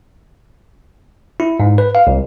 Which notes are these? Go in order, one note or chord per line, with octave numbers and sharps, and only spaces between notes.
E4
G#2
B4
F5
C2